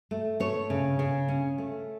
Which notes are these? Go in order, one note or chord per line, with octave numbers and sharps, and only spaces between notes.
A3
A3 C#5
C#3
C#3
C#4
A3